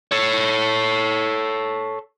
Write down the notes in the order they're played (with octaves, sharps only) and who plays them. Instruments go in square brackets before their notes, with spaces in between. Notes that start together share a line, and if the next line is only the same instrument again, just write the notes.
[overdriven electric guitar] A4 C#5